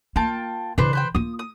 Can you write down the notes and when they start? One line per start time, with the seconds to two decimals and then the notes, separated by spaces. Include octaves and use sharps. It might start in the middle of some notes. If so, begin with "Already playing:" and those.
0.16 A#3 F4 G5 A5
0.78 C#3 E3 D4 B4 C5
0.93 B4 C5 G5
1.15 A#3 F4 D#6
1.39 D#6